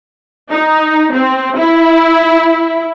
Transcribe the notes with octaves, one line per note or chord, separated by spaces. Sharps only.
D#4
C4
E4